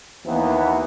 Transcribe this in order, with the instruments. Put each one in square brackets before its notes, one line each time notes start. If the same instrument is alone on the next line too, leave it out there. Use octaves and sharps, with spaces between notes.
[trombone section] D#2 E3 A#3 B3